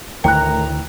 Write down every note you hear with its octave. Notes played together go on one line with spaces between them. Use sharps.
D2 A2 D#3 E3 A#4 G5 A#5 F#6